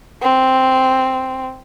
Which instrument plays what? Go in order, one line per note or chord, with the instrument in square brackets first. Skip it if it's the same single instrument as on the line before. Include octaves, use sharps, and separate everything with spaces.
[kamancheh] C4